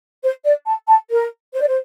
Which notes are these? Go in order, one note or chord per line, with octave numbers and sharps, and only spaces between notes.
C5
D5
A5
A5
A#4
C5
D5
C5